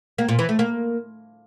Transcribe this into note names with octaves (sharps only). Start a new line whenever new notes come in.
A#3
A#2
E3
A3
A#3